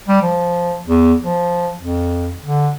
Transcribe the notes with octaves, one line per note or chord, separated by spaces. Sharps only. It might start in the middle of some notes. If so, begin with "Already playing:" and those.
G3
F3
E2
F3
F2
D3